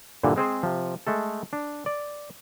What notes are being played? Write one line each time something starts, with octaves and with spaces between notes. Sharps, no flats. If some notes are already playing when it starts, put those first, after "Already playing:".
G2 A#2 D3 E3
G#3 C4 G#4 C5
C3 F3
G#3 A3 A4
D4
D5